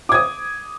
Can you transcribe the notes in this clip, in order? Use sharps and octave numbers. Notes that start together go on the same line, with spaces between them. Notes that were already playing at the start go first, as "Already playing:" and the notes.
D6 D#6 G#6